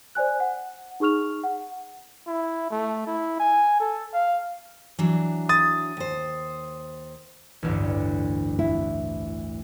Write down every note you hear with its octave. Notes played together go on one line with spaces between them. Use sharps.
C5 D5 G#5 F#6
F#5
D#4 G#4 C#6 F6 F7
F#5
E4
A3
E4
G#5
A4
F5
E3 F#3 D4
D#6 A6
D#2 C5
A1 D2 G2
E4